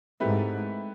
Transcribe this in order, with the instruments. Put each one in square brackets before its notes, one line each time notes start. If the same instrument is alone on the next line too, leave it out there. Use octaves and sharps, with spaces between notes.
[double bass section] G#2 [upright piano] A3 C4 E4 G4 B4